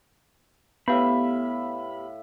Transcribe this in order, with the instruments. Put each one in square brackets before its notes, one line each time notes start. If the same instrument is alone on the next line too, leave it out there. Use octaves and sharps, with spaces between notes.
[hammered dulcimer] A2 E5 F5 [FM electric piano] B3 G4 [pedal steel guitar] B5